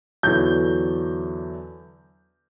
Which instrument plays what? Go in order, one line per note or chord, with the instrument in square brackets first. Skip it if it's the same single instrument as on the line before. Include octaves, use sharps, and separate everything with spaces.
[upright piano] E2 D3 F#3 G6